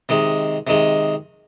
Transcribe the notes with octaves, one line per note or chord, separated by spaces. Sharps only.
C3 D#3 G#3
C3 D#3 G#3